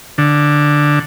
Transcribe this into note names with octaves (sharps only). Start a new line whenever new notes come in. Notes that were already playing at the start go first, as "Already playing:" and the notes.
D3